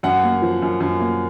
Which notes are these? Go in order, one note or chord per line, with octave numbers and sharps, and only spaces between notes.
F#2 F#5
A#3
F3
F#2
F#2
A#3